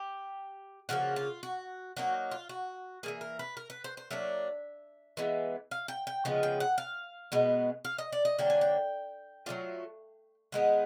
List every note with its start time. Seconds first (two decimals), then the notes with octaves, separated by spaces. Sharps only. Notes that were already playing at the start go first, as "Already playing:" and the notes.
Already playing: G4
0.89 C#3 F3 A#3 F#4
1.16 F4
1.43 F#4
1.97 F#3 A#3 D#4 F#4
2.31 F4
2.49 F#4
3.03 E3 G3 A#3 G#4
3.21 A#4
3.39 B4
3.57 A#4
3.70 B4
3.84 C5
3.97 C5
4.11 F#3 A#3 D4 E5
5.17 E3 G#3 B3
5.71 F5
5.88 G5
6.07 G5
6.25 C#3 F3 G#3 B3
6.43 G5
6.60 F#5
6.78 F5
7.32 B2 G#3 B3
7.85 F5
7.98 D#5
8.12 D5
8.25 D#5
8.39 D3 F#3 A#3 D4 G5
8.50 G#5
8.61 G5
9.46 F#3 A3 D4 F4
10.52 D#3 G#3 B3 D#4 F#5